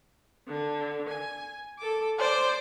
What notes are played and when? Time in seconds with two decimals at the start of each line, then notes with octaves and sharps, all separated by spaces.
0.47 D3
1.09 G#5
1.79 A4 D6
2.19 C5 D5 D6